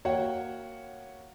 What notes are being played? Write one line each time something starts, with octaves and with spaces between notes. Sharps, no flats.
A#3 F#4 C#5 F#5 G5